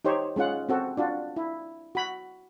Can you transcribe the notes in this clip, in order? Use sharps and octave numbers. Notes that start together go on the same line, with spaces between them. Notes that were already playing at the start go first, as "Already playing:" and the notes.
D#4 G4 C5 C#5
G#3 C#4 F4 F#5
C4 F#4 A4
D4 F4 F#4
E4
F#4 B5